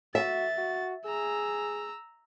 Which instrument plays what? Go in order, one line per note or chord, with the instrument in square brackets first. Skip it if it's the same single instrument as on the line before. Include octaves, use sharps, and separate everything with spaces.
[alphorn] F#4 [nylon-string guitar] E5 [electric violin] A6
[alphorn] F#4
[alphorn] G#4 [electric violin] A#5 E6